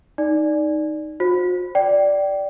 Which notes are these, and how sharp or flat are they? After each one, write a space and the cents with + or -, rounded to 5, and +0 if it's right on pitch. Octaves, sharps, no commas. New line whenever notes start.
D#4 +0 D5 +0
F#4 -45 C5 +20
D5 -5 G5 -25